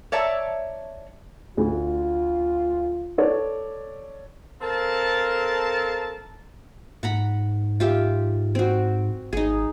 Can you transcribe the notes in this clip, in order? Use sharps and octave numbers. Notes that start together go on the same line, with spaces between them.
C#5 D5 E5 A5 A#5
D2 F4
A4 C#5 D5
C4 A4 A#4 F5 A5
G#2 F#5 A#5 B5
F4 G4 E5
C4 F#4
G#1 D#4 G#4